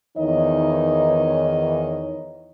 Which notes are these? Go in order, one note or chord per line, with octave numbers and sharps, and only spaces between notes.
E2 D#3 E3 D#4 C#5 D#5